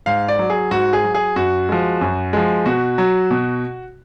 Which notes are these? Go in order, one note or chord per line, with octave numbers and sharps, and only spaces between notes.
G#2 F5
D5
F#3
G#4
G#2 F#4
G#4
F#3
G#4
F#2 F#4
F3 G#3
F#2
F3 G#3
B2 F#4
F#3
B2